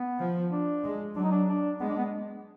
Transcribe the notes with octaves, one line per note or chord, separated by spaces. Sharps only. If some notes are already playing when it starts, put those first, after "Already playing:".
Already playing: B3
F3
D4
G#3
F#3 D4
D#4
D4
D4
G#3 B3
D4
B3